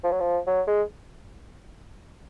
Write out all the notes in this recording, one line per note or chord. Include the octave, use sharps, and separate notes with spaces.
F3
F#3
F3
F#3
G#3